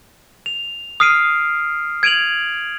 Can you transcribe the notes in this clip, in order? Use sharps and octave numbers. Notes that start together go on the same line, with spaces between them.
F7
D#6 F6 C7 D7 D#7
G#6 D7 D#7 F7 F#7